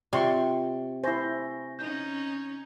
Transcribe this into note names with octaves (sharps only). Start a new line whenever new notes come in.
C3 F4 D5 G5 C6 C#6
E4 C5 G#5 C#6 A#6
C#4 D#4 G6